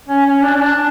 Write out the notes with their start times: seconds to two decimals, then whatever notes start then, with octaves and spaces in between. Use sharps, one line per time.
0.08 C#4
0.26 C#4
0.42 D4
0.54 C#4
0.59 D4